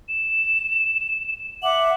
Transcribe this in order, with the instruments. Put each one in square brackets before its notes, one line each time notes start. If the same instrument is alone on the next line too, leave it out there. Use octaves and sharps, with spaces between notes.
[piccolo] E7
[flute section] E5 F#5 D6 [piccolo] F#7